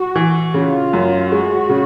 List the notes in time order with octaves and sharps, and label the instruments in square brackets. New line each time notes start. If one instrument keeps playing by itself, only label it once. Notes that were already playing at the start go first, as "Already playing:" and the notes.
Already playing: [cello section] F#4
[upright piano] E3
[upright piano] C#3 [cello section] F4
[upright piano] F#2
[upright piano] G#3 [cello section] F#4
[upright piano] C#3